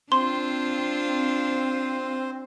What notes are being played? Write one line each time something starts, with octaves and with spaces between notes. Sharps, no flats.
C4 D4 F4 C5 C6